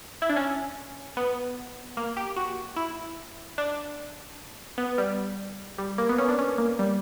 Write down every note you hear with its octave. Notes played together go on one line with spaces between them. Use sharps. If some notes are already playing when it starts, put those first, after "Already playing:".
E4
D4
C#4
B3
A#3
G4
F#4
E4
D4
B3
G3
G3
A#3
B3
C#4
D4
C#4
A#3
G3